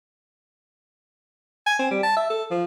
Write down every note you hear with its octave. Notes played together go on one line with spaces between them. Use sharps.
G#5
C4
G3
A5
E5
A4
F3